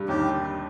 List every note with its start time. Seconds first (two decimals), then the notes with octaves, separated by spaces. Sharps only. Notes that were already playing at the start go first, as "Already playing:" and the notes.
Already playing: G2 G3
0.08 D#2 D#3 G4